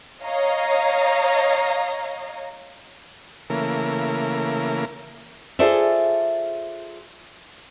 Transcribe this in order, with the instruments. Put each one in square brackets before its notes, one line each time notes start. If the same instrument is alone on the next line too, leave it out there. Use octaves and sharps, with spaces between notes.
[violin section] C#5 D#5 F5 A#5
[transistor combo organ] C#3 E3 A3 A#3 A#4
[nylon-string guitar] F4 G#4 A4 C5 D5 E5